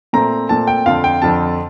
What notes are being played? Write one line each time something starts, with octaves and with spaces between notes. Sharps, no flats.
A#2 A3 C4 A#5
A#2 A3 C4 A5
G5
F2 D3 F3 C4 F5
G5
F2 D3 F3 C4 A5